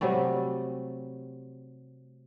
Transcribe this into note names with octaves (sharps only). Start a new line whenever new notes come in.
C3 F#3 G3 A3